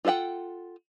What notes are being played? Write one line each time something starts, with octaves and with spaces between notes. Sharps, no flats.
F4 A4 D5 F#5 G5